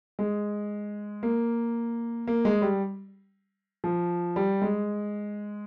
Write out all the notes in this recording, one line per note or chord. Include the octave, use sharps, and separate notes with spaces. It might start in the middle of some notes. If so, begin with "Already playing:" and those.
G#3
A#3
A#3
G#3
G3
F3
G3
G#3